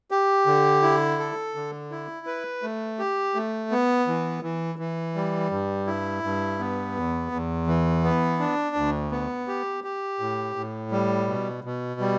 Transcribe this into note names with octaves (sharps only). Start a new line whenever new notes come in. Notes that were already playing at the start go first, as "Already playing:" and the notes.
G4
D3
E4
A4
D3
E4
B4
A3
G4
A3
B3
E3
E3
E3
G3
G2
E4
G2
B3
E2
E2
E3
B3
D4
D2
B3
G4
G4
A2
A2
G3
B2
B2
G3